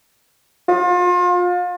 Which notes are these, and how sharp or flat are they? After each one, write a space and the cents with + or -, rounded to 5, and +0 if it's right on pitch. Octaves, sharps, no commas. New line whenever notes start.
F4 +35